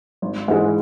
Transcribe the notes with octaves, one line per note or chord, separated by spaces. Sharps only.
G#1
G#2 E3 G#3